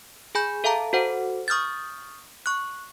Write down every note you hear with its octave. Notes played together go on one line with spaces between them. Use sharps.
G#4 G#5 B5 G6
A4 E5 F5 A5 A#5
F#4 A4 C5 F#5
C#6 D#6 F6 G6 A6
C#6 F#6